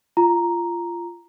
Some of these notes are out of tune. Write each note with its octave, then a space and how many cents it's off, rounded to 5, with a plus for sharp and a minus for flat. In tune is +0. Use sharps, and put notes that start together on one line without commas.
F4 -20 A#5 +0